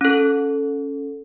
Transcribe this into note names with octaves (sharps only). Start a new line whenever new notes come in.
C#4 A4